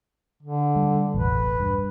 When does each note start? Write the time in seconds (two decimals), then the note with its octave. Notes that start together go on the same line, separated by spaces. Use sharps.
0.43 D3
0.76 G3
1.14 E1 A1 B4
1.60 G2